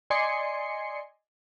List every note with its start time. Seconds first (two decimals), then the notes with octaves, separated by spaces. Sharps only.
0.10 D5 D#5 G#5 C6 C7 C#7